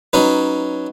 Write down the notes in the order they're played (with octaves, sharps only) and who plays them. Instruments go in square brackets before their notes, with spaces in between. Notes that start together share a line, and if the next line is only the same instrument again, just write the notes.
[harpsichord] F#3 C#4 D#4 B4